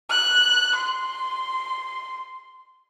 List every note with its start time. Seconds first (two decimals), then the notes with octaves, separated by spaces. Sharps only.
0.10 F#6
0.75 C6